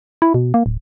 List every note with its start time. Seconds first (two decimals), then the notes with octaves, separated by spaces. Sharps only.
0.22 E4
0.34 B2
0.54 A#3
0.66 D1